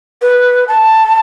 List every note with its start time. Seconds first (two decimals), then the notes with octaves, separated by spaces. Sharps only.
0.22 B4
0.68 A5